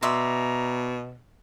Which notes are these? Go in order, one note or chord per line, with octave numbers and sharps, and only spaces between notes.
B2 D5 E5 A#5 C6